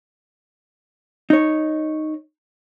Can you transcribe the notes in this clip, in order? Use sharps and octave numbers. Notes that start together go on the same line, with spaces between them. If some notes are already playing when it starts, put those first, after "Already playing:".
D#4 C#5